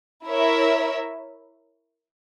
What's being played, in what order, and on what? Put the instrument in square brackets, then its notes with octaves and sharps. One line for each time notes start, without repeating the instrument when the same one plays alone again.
[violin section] E4 A#4 C#5 E5